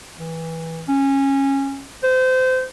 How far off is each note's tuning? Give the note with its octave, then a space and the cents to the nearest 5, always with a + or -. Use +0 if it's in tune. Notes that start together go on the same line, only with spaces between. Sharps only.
E3 -15
C#4 -15
C5 -25